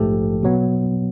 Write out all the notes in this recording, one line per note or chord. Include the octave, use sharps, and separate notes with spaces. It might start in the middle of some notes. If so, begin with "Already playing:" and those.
Already playing: A#1 G#2 F3 A3 G4 A4
B2 F#3 B3